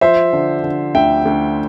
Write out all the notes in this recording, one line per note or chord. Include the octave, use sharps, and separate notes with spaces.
F3 C5 E5
D3
D3
D2 E5 G5
D2